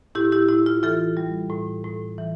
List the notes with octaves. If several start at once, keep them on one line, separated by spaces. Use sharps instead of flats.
A2 E4 G4
E4 G4
A2 E4
F4
E3 F4 A4
G3
A2
A2
E3